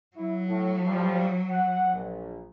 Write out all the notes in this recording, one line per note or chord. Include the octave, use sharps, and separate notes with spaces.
F#3 E4
A2
A2 F3 G3
F#5
A#1